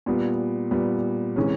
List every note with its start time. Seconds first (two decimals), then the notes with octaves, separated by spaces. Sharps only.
0.06 A#2 G3 B3
0.71 A#2 G3 B3
1.36 C3 E3 G#3 C#4